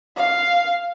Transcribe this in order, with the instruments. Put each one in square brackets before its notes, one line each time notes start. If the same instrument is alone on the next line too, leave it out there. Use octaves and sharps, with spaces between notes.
[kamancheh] F5